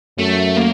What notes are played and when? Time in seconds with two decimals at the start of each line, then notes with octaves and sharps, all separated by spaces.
0.18 F#2 A3
0.57 A#3